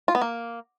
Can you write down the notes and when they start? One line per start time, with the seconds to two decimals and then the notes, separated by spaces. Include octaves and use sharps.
0.08 F4
0.15 B3
0.21 A#3